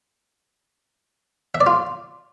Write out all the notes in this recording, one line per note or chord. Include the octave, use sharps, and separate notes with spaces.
E5
D5
F4